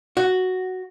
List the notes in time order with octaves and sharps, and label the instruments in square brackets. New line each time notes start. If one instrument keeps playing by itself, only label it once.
[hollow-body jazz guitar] F#4